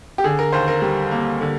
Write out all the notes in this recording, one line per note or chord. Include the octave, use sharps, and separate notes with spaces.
G4
D3 G#4
A#4
D#2 C5
A#4
G3
A#3
D3